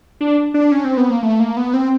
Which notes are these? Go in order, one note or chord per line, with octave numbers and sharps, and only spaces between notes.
D4
D4
C#4
C4
B3
A#3
A3
A#3
B3
C4